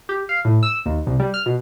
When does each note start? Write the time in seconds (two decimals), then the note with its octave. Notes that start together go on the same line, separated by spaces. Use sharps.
0.09 G4
0.29 F5
0.45 A2
0.63 E6
0.86 D#2
1.07 C2
1.20 G3
1.34 F6
1.46 B2